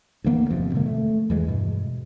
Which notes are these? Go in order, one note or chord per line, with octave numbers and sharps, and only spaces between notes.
D2 E3 A#3 B3
G1 F2 C3
B2 D3 G#3 A#3
A3
E2 E3 G#3
G2 B2